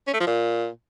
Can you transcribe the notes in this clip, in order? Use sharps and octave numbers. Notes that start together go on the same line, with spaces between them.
C#4
A3
F3
A#2